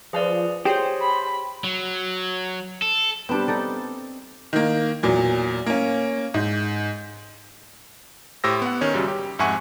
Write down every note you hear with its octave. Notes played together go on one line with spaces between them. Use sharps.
F3 G#4 B4 D5
G4 G#4 C5 C#5
B5
F#3
A4
G3 B3 C4 D4
D#4 A4 D5
D#3 A#3
E2 A#2 F#3
A#3 C#4
G#2
A2 G4 C5 E6 A#6
B3 F#5
D#3 C#4 C#5
F#2 C#3 F#3 G3
G4
F2 G#2 E5 F#5 G#5 C#6